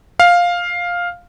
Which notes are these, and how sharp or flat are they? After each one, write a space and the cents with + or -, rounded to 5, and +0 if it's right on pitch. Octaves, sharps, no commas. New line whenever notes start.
F5 +5